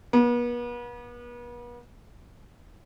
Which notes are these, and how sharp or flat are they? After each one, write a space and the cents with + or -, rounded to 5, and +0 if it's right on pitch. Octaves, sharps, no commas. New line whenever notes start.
B3 -40